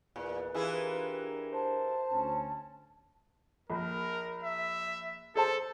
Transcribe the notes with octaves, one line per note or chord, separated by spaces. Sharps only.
E2 A#2 B4
E3 D4 E4 F4 G4 G#4 A#4
C5 A5
D2 C#4
A#1 A#4
E5
G#4 A4 C5 A5